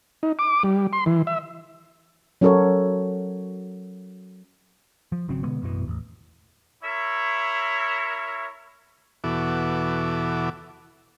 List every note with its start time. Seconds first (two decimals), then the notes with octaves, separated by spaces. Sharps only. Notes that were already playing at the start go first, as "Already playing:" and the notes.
0.23 D#4
0.39 D6
0.63 G3
0.93 C6
1.06 E3
1.27 E5
2.41 F#3 C#4 F#4 A4 A#4 C#5
5.12 F3
5.28 G#1 C#3 F#3 C4
5.43 B2 D3 G#3 B3
5.62 A1 F#2 B2 E3
5.86 A1 E2
6.83 E4 A#4 C#5 E5
9.24 E2 B2 E3 F#4 A4 D6